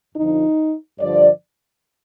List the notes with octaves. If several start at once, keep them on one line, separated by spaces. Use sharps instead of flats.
F2 D3 F3 D#4
G2 D3 F3 D5